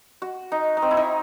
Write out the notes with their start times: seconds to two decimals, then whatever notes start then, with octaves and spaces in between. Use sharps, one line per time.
0.22 F#4
0.52 D#4
0.77 D#4
0.82 C4
0.91 E4
0.97 D#4